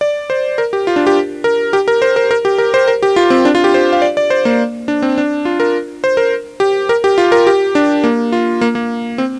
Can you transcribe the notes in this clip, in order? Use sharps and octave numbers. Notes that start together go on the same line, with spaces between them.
D5
C5
A#4
G4
F4
D4
G4
A#4
G4
A#4
C5
A#4
A#4
G4
A#4
C5
A#4
G4
F4
C4
D4
F4
G4
C5
F5
D5
D5
C5
A#3
D4
C4
D4
F4
A#4
C5
A#4
G4
A#4
G4
F4
A#4
G4
D4
A#3
F4
A#3
A#3
C4